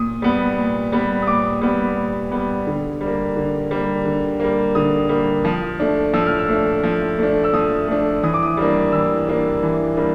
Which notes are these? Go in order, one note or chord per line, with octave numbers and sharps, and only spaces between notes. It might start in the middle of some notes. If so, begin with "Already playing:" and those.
Already playing: A#2 D#6
G3 B3
A#2
G3 B3
D#6
A#2 D6
G3 B3
A#2
G3 B3
D3
G3
A#3
D3
G3 A#3
D3
G3 A#3
D3 D#6
G3 A#3
F3
A3 D4
F3 E6
F6
E6
A3 D4
F3
A3 D4
E6
F3 D#6
A3 D4
E3 D#6
D6
D#6
G3 A#3 D4
E3 E6
G3 A#3 D4
E3
G3 A#3 D4